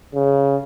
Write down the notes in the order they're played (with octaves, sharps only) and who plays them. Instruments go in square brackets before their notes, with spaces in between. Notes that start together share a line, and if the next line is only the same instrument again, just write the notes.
[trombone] C#3